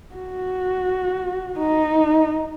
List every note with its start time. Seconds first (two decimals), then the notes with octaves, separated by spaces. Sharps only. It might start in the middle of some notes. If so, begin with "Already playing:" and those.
0.15 F#4
1.58 D#4